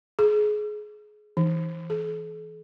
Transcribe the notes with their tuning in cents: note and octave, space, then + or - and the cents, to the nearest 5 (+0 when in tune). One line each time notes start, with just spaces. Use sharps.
G#4 +25
E3 -5
A4 -45